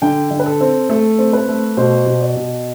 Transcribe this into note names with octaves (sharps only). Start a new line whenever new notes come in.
D3 G5
D3
B4
A4
C4
A3 A4
C4
B4
A3
B2 C5
B2
D5
B2